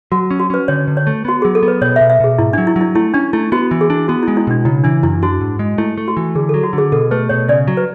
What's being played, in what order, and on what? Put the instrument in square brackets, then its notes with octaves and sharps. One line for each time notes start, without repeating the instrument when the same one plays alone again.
[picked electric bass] F#3 [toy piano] F#4
[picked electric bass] C#4
[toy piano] F#4
[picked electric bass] C#4 [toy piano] B4
[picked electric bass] D3 [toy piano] C#5
[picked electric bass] D3
[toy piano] C#5
[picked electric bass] A3
[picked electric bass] B3 [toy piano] F#4
[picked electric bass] F#3 [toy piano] G#4
[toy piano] A4
[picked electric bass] B3
[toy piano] B4
[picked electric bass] B2 [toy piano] C#5
[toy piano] E5
[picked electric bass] B2
[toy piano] E5
[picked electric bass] B2 [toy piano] G#4
[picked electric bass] G#2 [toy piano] E4
[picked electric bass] F#3 [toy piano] D4
[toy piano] E4
[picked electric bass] F#3
[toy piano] E4
[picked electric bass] A3 [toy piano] E4
[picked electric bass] C#4 [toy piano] D4
[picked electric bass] A3 [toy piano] E4
[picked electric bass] B3 [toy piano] F#4
[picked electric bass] E3
[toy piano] G#4
[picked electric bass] D4
[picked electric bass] B3 [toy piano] F#4
[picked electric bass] G#3 [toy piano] E4
[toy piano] E4
[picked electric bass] B2 [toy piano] D4
[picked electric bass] C#3 [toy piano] E4
[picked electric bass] E3 [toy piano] D4
[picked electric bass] F#2 [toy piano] E4
[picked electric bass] D4 [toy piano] F#4
[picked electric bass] G#2
G#3
[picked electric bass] A3 [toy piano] E4
[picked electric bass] A3
[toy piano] F#4
[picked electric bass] E3
[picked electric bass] D3 [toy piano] G#4
[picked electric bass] F#3 [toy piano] A4
[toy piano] F#4
[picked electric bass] D3
[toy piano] G#4
[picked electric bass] B2 [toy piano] A4
[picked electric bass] A3 [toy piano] B4
[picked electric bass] B2 [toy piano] C#5
[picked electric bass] C#3 [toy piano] D5
[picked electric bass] F#3
[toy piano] B4